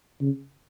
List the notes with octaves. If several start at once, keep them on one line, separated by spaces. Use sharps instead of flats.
C#3